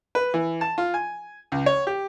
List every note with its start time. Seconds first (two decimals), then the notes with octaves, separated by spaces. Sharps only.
0.15 B4
0.34 E3
0.61 A5
0.78 F4
0.94 G#5
1.52 C#2
1.66 C#5
1.87 G4